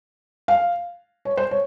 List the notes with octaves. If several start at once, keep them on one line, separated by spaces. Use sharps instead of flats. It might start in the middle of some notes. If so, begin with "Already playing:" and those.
F5
C#5
C5
C#5